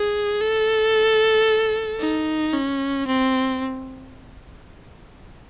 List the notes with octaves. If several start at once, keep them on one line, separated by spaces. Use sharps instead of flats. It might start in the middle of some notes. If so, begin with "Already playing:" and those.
Already playing: G#4
A4
D#4
C#4
C4